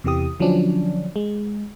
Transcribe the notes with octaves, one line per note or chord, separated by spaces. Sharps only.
E2 C3 E3 G4 D#6
D3 F3 F#3 C#4 D4
G#3